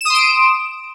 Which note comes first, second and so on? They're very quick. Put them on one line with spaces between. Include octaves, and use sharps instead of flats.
E7 D#6 C6 D7